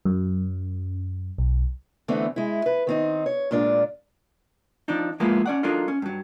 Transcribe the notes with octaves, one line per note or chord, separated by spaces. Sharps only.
F#2
B1
D3 E3 A3 B3 C4 D4
G#3 E4
B4
D#3 C4 D#4
C#5
A#2 G#3 D4 F4 D5
F3 C4 D4 D#4
F3 G#3 A#3 B3 E4 F4
C#4 D5 F#5
F#3 D4 D#4 F4 A4 A#4
C#4
G2 F#3